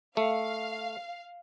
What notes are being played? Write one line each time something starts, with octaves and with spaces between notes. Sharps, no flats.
A3 F5